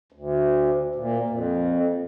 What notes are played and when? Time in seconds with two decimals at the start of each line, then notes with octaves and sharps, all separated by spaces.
0.12 D2
0.95 A#2
1.30 F2